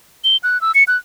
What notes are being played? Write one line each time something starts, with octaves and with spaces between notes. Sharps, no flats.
G7
F#6
E6
C#7
F#6